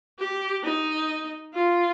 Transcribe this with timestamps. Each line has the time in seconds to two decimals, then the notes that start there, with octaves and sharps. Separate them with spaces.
0.19 G4
0.64 D#4
1.55 F4